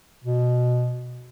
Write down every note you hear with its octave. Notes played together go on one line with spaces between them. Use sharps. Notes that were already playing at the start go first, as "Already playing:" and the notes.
B2